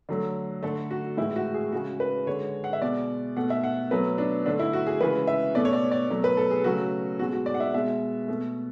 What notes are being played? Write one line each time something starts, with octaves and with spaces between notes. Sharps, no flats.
D3 F#3 A3
D3 A3 A4
F#4
A2 E3 G#3 E4
F#4
G#4
C#3 G#3 F#4
B4
D3 G#3 C#5
F#5
E5
B2 G#3 D5
B2 A3 F#5
E5
F#5
B2 F#3 A3 B4
D4
D3 A3 D4
E4
F#4
G#4
C#3 E3 G#3 B4
E5
B2 A3 D5
C#5
D5
D5
B2 F#3 A3
B4
A4
G#4
C#3 F#3 A3 F#4
B2 G#3 F#4
F#4
D5
F#5
E5
B2 G#3 E5
B2 A3